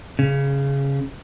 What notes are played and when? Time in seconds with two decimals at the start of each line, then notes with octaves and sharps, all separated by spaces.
0.19 C#3